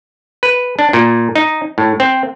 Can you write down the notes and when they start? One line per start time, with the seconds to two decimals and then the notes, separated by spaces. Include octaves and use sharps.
0.43 B4
0.79 D4
0.93 A#2
1.35 D#4
1.78 A2
2.00 C4